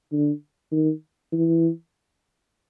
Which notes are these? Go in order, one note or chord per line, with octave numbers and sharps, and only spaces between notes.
D3
D#3
E3